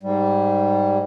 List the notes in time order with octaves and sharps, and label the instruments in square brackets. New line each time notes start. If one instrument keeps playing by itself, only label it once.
[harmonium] G#2 G3